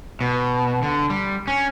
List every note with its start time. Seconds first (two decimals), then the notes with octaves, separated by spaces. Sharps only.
0.21 B2
0.82 D3
1.10 G3
1.48 C#4